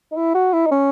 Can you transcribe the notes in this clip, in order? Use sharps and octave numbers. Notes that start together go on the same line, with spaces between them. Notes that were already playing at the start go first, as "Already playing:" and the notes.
D#4
E4
F#4
E4
D#4
C#4